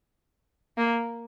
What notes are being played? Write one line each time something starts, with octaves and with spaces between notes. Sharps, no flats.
A#3